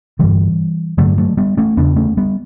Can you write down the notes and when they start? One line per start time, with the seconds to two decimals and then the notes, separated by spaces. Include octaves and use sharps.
0.19 G2 D3 E3 G3
0.98 G2 D3 F#3 A3
1.18 F#3 A3
1.37 G3 B3
1.57 A3 C#4
1.77 E2 C#3 B3 D4
1.96 A3 C#4
2.17 G3 B3